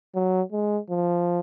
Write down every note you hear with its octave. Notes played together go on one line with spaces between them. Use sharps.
F#3
G#3
F3